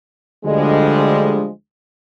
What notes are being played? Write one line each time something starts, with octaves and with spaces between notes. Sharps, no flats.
D2 D3 F3 G3 G#3